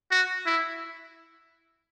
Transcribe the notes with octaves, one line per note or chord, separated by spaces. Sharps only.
F#4
E4